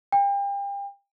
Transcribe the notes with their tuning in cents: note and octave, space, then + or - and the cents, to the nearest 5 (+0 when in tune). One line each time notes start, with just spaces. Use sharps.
G5 +35